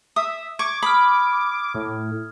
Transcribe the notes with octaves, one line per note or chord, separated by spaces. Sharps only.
E5 D#6
C#6 D6 G#6
B5 D#6 F6
A2